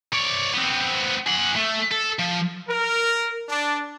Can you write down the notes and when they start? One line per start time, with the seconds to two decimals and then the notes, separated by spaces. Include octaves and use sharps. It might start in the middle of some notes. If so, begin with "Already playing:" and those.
0.13 C#5 D5
0.53 B3 C4
1.27 G#4 F#5
1.56 A3
1.92 A4
2.19 F3
2.67 A#4
3.49 D4